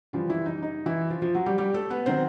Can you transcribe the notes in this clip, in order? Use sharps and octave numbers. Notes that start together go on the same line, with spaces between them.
F#2 C#3 E3 F3 G3 F4
E3 E4
D#4
D#4
E3 E4
F3 F4
F3 F4
F#3 F#4
G3 G4
G3 G4
A3 A4
B3 B4
D#3 F#3 C4 C5